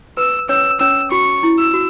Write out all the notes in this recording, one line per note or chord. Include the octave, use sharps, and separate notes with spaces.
B4 E6
C#4 C#5 E6
C#4 C#5 E6
F#4 C#6
E4
E6
F#4